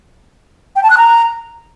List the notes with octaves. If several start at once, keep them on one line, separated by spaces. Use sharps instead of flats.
G5
A5
F#6
A#5